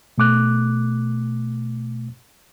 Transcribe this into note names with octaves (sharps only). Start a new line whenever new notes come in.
B2 A3 D6 F#6